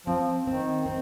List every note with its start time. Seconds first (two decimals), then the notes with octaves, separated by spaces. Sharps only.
0.07 F3 C4
0.46 D#3 C4
0.86 C4